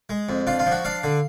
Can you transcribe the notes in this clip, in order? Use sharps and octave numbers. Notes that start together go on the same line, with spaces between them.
G#3
F2
D4 F4
F4
F3
F#4
D4 F5
D3